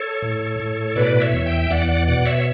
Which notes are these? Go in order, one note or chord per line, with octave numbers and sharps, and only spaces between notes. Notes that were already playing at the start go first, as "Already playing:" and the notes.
Already playing: A4 C#5
A2
A2
B2 B4 D5
C#5 E5
E2
E5 G5
E2 D5 F#5
D5 F#5
B2 D5 F#5
C#5 E5
C#5